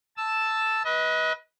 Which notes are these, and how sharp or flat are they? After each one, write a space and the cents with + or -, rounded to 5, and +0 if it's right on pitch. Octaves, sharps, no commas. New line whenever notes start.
A5 +0 E6 +0
B4 -10 D#5 +30